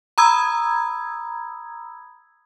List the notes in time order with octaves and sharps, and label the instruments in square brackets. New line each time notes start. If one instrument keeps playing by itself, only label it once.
[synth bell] A#5 B5 D#6 E6 G#6